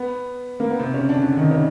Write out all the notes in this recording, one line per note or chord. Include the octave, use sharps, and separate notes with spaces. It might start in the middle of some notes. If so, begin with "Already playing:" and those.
Already playing: B3
A#3
B3
C3 C4
C#3 C#4
D3 D4
D3 D4
D#3 D#4
C#3 C#4